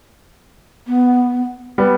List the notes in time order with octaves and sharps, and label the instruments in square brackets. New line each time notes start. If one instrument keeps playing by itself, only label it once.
[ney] B3
[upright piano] G3 B3